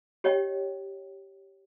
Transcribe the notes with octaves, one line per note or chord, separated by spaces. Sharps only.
G4 C#5 D#5 G5